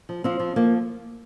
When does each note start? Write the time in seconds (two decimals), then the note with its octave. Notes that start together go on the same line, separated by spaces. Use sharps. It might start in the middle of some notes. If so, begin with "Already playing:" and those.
0.09 F3
0.24 F3 C4
0.40 F3
0.56 F3 A#3